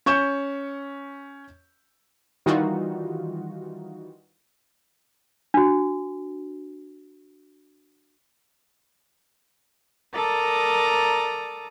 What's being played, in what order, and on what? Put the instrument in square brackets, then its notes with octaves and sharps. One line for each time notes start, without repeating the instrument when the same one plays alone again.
[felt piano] C#4 C#6 G6 E7
[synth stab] D#3 E3 G3 D#4 F4 F#4
[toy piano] D4 F#4
[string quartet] A4 A#4 D5 A#5 D#6